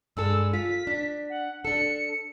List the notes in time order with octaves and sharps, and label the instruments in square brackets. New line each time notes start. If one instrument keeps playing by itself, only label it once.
[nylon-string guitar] G2 G#3 A4 [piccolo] E6
[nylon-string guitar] F4 [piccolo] B6
[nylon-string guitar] D4
[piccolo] F#5
[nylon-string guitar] D4 A4 [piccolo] C#7